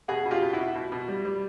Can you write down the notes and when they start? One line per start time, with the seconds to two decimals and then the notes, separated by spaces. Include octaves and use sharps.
0.08 B2 F#4 G#4
0.25 B2
0.31 F4 G4
0.42 B2
0.53 B2 E4 F#4
0.75 B2
0.92 B2
1.08 G3
1.25 G3